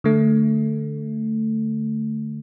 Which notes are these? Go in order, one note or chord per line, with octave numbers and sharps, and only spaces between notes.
D3 A3